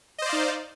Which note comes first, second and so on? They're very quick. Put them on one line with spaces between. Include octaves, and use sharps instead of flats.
D#5 C5 D5 F5 D#4